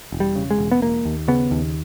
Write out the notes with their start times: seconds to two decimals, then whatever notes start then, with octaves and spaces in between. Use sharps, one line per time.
0.12 E1
0.20 G3
0.35 C#3
0.51 G#3
0.58 E1
0.71 B3
0.82 E1 A#3
1.05 D#2
1.28 C#3 B3
1.51 D#2